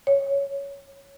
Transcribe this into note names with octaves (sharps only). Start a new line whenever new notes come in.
C#5